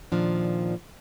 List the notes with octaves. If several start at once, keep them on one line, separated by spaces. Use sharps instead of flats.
A#2 D#3 F3 D4